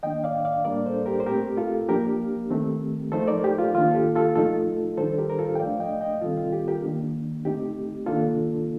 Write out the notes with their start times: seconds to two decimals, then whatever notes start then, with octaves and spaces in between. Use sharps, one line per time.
0.03 D#3 A#3 D4 D#5 G5
0.24 D5 F5
0.45 D5 F5
0.65 A2 G3 A#3 D4 A#4 D5
0.86 A4 C5
1.06 G4 A#4
1.20 C5
1.26 A#2 A3 C4 G4 A#4
1.57 F4 A4
1.89 F3 A#3 D4 G4 A#4
2.50 D#3 A3 C4
3.12 F3 A3 D#4 A4 C5
3.28 A#4 D5
3.44 G4
3.58 F4
3.74 D#3 A#3 D4 F4
3.91 A4
3.95 G4
4.16 F4 A4
4.36 A#2 F3 A3 D#4 F4 A4
4.97 D#3 G3 D4 A4 C5
5.18 G4 A#4
5.30 A#4
5.39 F4 A4
5.55 G5
5.59 F3 A3 D4 D5 F5
5.80 D#5 G5
6.01 D#5 G5
6.21 C3 D#3 G3 C4 F4 A4
6.37 F4
6.52 G4
6.68 G4 A#4
6.83 D#3 A#3 D4
7.45 D3 A3 C4 D#4 G4
8.06 C3 D#3 A#3 D4 F4 A4